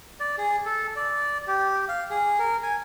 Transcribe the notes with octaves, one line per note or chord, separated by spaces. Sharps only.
D5
G#4
A4
D5
G4
F5
G#4
A#4
G#5